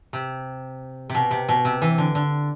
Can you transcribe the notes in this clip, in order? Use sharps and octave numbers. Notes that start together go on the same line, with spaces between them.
C3
C3
B2
C3
B2
C3
E3
D3
D3